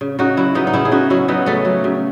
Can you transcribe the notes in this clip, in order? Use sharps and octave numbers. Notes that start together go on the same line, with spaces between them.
C#3
C#3 D#4 F#4
F#3 C#4 E4
C#3 B3 D#4
D#4
C#3 C#4 E4
G#4
C#3 D#4 F#4
F#3 C#4 E4
F#3 B3 D#4
C#3 A3 C#4
F#3
C#3